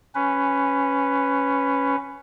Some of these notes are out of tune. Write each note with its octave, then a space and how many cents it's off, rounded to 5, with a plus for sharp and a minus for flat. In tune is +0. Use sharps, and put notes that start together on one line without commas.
C#4 +0 B4 +10